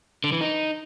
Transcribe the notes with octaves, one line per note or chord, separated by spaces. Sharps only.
D3
E3
D#4